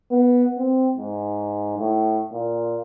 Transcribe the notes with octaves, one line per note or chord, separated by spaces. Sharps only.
B3
C4
G#2
A2
A#2